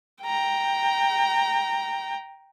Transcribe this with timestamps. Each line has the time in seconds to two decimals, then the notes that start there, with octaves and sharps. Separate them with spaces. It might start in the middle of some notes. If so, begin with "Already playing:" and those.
0.23 G5 A#5